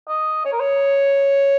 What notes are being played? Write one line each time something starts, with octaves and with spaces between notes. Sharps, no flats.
D#5
C#5
A#4
C#5